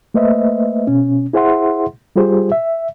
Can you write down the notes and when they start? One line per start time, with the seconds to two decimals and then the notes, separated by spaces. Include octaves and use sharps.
0.14 A3 A#3 B4 C5 D#5 E5
0.87 B2 C#4
1.33 E4 G#4 C5 E5 F#5 C6
2.16 G3 F4 G4 G#4 C5
2.52 E5